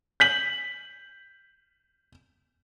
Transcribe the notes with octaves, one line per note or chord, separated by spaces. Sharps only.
G6 B6 F#7